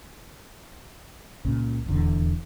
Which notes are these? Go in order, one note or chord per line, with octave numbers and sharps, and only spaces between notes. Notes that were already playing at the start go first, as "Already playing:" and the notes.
C#2 A#2 C#3
D#1 E2 D3